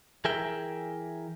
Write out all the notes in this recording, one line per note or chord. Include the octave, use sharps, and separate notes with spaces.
E3 G#4 A#4 E5 G5